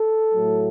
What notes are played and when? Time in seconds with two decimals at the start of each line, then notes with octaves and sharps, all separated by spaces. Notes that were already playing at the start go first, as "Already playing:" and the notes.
Already playing: A4
0.34 A2 F#3 A3